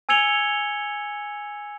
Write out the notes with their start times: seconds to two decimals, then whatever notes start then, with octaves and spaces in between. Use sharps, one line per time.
0.09 G#5 E6 G#6 C#7 F7 G7